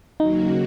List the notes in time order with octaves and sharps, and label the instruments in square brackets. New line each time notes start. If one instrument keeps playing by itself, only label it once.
[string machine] D#2 C#3 F#3 A#3 F#4 [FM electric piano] D#4